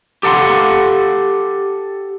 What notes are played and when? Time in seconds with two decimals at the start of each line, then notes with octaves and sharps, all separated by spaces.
0.23 G4 A4 F#5 A5 C6